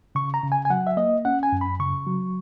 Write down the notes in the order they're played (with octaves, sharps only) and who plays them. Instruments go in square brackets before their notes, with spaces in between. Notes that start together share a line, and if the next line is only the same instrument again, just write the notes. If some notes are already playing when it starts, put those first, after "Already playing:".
[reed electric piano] C#3 C#6
A#5
C#3
G#5
G#5
F#3 F#5
E5
A#3 D#5
C#4 F#5
G#5
F#2
B5
C#3 C#6
F#3